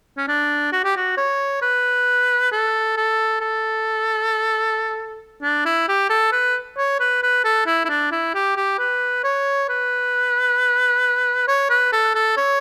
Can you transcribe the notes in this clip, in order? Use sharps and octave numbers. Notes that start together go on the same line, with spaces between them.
C#4
D4
F#4
G4
F#4
C#5
B4
A4
A4
A4
D4
E4
G4
A4
B4
C#5
B4
B4
A4
E4
E4
D4
E4
G4
G4
B4
C#5
B4
C#5
B4
A4
A4
C#5